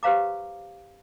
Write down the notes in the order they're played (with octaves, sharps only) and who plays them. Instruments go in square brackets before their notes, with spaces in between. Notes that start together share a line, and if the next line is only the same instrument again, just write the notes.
[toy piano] G4 B4 C5 F5 A#5 D6